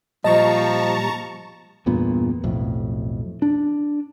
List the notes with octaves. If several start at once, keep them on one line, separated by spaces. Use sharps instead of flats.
A#2 F3 G3 D#5 A5 A#5 C#6
E2 G2 A#2 B3
B1 F2 A2
D4